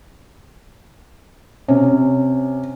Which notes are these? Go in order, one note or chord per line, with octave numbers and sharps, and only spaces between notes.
C3 C#4